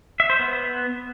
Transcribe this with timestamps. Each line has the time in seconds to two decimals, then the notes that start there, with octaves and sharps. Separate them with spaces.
0.20 E5
0.30 C5
0.39 B3